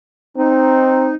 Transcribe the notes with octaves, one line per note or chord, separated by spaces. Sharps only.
C4 D#4